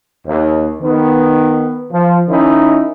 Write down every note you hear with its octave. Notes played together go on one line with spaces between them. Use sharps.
D#2
D#3 B3
F3
D#3 C#4 D#4 E4